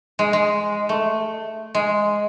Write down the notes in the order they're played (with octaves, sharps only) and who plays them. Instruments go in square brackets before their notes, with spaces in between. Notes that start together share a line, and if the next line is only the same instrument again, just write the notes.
[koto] G#3
G#3
A3
G#3